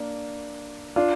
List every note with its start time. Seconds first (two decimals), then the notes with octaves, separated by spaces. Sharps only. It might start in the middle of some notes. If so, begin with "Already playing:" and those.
Already playing: A#3 D4
0.96 D4 F4